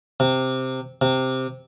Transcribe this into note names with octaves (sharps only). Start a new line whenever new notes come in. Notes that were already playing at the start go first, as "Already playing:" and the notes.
C3
C3